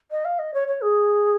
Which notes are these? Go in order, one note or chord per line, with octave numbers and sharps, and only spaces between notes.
D#5
F5
D#5
C#5
C#5
G#4